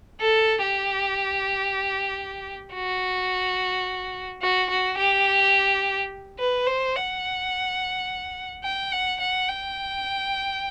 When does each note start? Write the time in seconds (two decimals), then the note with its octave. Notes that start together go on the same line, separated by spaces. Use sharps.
0.21 A4
0.62 G4
2.74 F#4
4.42 F#4
4.70 F#4
4.98 G4
6.39 B4
6.67 C5
6.95 F#5
8.64 G5
8.92 F#5
9.20 F#5
9.49 G5